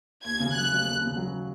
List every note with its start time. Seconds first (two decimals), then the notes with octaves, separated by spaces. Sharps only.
0.24 D#2 G#6
0.40 C#3
0.55 F#3 F#6
0.72 F1
0.86 D#2
1.01 C#3
1.17 F#3